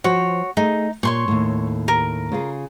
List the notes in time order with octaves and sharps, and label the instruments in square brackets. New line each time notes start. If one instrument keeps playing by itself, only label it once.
[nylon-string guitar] F3 C5 [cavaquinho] F#4 C#5
[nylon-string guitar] A3 G#4 [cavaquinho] D#4
[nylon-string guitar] A#2 [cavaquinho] C#5 C6 C#6
[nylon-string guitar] D#2 A2
[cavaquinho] A#4
[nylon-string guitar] C#3 F4 G#4